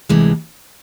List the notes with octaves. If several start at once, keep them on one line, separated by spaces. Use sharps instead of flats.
D2 C3 E3 G#3